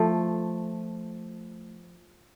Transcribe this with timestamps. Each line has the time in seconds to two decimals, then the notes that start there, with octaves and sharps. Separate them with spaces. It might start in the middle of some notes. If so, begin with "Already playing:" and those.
Already playing: F3 A3